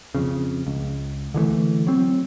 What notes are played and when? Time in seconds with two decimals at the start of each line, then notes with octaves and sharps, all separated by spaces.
0.15 F2 C#3
0.67 C#2
1.34 D3 E3 G#3 A3
1.87 F#3 C4